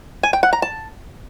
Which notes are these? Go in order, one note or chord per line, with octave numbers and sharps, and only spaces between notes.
G#5
G5
F#5
A#5
A5